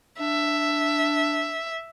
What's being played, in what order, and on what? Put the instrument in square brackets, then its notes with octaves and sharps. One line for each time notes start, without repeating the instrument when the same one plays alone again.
[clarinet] D4 [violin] E5